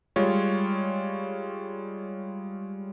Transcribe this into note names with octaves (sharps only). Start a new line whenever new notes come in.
G3 G#3 F4 C#5